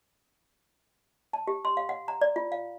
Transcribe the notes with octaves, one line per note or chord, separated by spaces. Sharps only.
A5
G4
C6
F5
F#5
A#5
D5
F4
F5